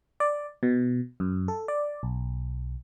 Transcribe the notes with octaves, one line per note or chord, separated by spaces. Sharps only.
D5
B2
F#2
A4
D5
B1